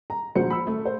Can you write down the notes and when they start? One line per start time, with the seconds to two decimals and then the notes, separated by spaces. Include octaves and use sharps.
0.10 A#5
0.35 A#1 F#4 C5 C#7
0.50 B5 E6
0.67 A3
0.85 C5